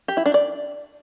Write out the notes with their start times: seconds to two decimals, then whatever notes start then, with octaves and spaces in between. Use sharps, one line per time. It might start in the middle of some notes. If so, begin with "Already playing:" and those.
0.08 G4
0.17 E4
0.26 D4
0.34 D5